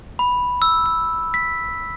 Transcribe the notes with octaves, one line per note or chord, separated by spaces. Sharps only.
B5
E6
E6
B6